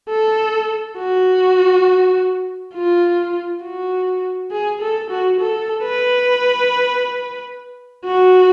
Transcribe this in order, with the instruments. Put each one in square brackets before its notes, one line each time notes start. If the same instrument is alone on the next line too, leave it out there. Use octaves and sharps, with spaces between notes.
[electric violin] A4
F#4
F4
F#4
G#4
A4
F#4
A4
B4
F#4